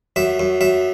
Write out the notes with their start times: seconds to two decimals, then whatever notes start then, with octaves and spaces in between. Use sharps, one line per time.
0.16 F#2 E5
0.40 F#2
0.61 F#2 E5